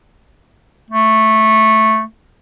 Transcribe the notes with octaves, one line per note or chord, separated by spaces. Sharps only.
A3